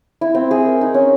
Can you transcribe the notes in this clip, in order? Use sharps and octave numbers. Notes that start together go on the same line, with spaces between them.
E4
C4
G#4
A#4
D#4
C#4